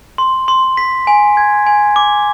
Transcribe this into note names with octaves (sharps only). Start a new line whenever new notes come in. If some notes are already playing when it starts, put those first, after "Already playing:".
C6
C6
B6
G#5
G#6
G#5
D6